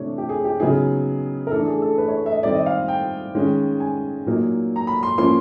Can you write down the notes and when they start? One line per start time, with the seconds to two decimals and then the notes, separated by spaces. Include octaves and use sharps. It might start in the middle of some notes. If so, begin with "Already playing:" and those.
Already playing: C3 E3 A3 D4 C#5
0.18 G4
0.29 G#4
0.44 G4
0.60 C#3 F#3 B3 D#4 G#4
1.47 A#4
1.51 E3 A3 D4 A4
1.67 G#4
1.82 A4
1.98 B4
2.08 C#5
2.26 E5
2.32 D#5
2.43 D#3 G3 C4 D5
2.54 D#5
2.66 F5
2.88 G5
3.35 D#3 G#3 C#4
3.80 G#5
4.26 A#2 F#3 A#3 D#4
4.76 A#5
4.87 B5
5.03 C6
5.18 F3 A#3 C#4 C6